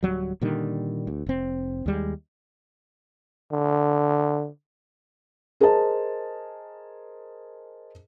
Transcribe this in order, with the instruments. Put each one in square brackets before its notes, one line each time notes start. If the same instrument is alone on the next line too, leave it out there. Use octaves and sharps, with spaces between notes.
[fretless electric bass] D1 G1 F#3 G3
A#2 D3 D#3 G3
D2
F1 C4
D#2 G3 G#3
[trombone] D3
[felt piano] G#4 A#4 C5 D#5 A5